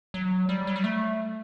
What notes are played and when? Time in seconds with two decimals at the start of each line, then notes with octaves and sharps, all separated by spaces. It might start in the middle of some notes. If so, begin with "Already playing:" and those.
0.14 F#3
0.49 G3
0.67 F#3
0.76 G3
0.84 A3